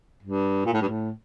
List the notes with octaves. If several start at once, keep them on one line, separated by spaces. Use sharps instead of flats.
G2
A#2
A2
G2
A2